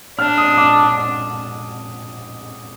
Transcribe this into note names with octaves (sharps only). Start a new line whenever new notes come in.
D4 F6
D#6
D6